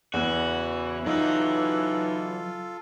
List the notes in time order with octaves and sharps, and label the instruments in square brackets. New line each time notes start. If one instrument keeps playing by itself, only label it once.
[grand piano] E2 [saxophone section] C#3 E3 [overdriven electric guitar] F#4
[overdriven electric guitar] F#3 F#5 [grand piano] D#4 [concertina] F4 A4